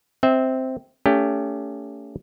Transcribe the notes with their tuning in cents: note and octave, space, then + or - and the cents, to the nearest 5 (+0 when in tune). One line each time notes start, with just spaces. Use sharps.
C4 +0 E5 -25
A3 +25 C#4 +35 G4 +20